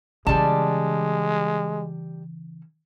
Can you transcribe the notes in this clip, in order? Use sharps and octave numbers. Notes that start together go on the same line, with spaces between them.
C#3 E3 G3 G#3 A5